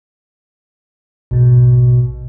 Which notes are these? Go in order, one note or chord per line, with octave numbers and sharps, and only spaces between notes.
A#1 G#2 B2